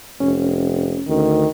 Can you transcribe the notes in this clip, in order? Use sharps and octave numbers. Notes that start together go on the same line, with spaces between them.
F1 C#4
D2 D#3